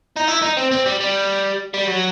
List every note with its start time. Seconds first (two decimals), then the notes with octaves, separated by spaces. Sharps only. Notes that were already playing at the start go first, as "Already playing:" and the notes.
0.17 D#4
0.28 E4
0.42 D#4
0.57 C4
0.71 C4
0.86 G3
1.00 G3
1.74 G3
1.87 F#3